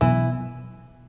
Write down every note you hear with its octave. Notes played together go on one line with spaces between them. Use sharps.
B2 E3 F#3 B3 E4